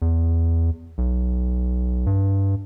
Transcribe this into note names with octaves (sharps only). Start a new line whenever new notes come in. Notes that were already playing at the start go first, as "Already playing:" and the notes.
E2
B1
G2